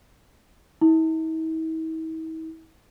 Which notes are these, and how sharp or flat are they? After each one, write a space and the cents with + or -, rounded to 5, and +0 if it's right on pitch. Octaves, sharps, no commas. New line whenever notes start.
E4 -45